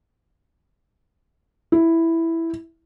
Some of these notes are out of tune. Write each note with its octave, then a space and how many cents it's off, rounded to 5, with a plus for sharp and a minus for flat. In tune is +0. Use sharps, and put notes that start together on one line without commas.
E4 +0